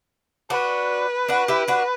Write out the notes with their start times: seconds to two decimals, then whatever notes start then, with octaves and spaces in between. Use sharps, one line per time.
0.50 D4 F#4 B4
1.28 D4 F#4
1.48 E4 G4
1.68 D4 F#4